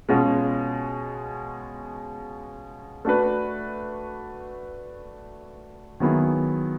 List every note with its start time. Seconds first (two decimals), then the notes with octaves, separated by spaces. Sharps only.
0.09 B2 G#3 C#4 F4
3.05 A3 D4 F#4 B4
6.00 D#3 F#3 B3 E4 G#4